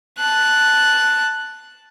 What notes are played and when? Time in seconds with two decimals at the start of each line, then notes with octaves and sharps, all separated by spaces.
0.19 A5 F#6